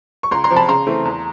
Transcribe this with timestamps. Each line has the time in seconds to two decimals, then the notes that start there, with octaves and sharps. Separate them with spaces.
0.23 C#6
0.31 C#2 A#5 C6
0.44 A#5 C6
0.50 C3 F3
0.56 A5 B5
0.68 C#3 A#5 C6
0.87 E3 A3 C4
1.05 E2